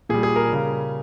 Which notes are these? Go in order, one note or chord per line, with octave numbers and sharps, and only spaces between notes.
A#2 G3 G#4
G#4
A#4
C#3 G3